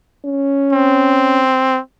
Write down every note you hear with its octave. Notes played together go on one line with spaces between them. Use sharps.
C#4
C4